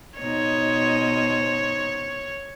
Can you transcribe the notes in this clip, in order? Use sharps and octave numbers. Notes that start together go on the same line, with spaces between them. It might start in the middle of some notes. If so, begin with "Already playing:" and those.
B2 D#4 C5 C#5